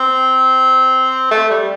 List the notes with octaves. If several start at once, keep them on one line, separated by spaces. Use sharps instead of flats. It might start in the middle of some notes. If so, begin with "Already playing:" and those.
Already playing: C4
A3
G3